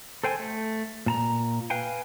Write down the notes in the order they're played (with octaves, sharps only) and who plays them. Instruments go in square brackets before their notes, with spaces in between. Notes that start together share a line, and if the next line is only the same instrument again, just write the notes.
[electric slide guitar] A4 C5 G5 G#5
A3
A#2 A5 A#5
B4 F5 G5 G#5